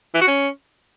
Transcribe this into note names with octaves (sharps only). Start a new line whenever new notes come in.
E3
F#4
C#4